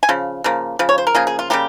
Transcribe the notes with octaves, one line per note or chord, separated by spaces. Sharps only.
G#5
C#3 F3
C#3 F3 A#3
C#3 F3
C#5
C5
A#4
C#3 F3 A#3 G#4
G#4
F4
C#3 G3 A#3 G4